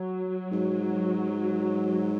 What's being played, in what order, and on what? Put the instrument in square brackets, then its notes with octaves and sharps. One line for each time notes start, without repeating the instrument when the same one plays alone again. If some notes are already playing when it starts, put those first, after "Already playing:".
Already playing: [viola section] F#3
[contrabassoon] G#2